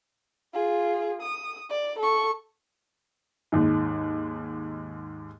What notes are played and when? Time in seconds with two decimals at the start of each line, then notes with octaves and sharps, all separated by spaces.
0.54 F4 G#4
1.22 D#6
1.70 D5
1.99 A4 C#6
3.52 D#2 G#2